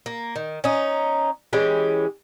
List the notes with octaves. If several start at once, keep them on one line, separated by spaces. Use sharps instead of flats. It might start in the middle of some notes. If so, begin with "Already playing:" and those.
A#3
D#3
C#4 D#4
E3 G#3 C#4 G4